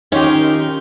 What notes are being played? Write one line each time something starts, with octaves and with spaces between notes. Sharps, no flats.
D#3 C#4 D#4 F4 G4 A#4 C6